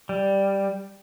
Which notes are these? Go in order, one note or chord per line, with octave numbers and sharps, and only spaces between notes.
G3